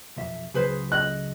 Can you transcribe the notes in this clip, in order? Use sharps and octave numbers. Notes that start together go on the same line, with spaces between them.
B1 F2 E5
C#2 C#3 F#3 G#4 B4 C5
D#5 F#6